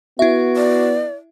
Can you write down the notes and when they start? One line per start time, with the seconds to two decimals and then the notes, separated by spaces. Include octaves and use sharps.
0.19 B3 E4 F#4 E5
0.56 D5